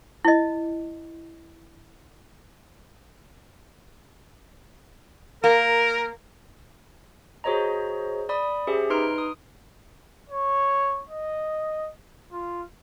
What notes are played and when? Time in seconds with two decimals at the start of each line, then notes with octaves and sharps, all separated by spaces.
0.25 E4 D#5
5.44 A#3 A#4
7.44 F#4 G#4 C5 C#5 D#5 A#5
8.29 D5 B5 D#6
8.67 C#4 G4 G#4 C5 E5
8.90 D#4 B4 A#5 C6 F6 D7
9.18 D#6
10.30 C#5
11.09 D#5
12.32 F4